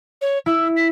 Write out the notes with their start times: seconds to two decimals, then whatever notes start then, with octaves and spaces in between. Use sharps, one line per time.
0.21 C#5
0.46 E4 E6
0.76 B6